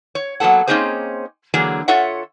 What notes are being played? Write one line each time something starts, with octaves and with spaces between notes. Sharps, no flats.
C#5
F#3 A#3 B3 A4 F#5
A#3 C4 C#4 D#4 G#4 C5
D3 E3 F#3 A#3 G#4
F4 A4 C#5 E5 F#5